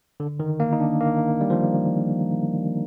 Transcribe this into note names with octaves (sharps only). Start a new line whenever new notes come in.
D3
D#3
A#3
D#4
D4
A#3
G3
F3